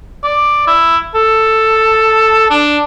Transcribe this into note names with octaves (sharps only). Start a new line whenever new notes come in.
D5
E4
A4
D4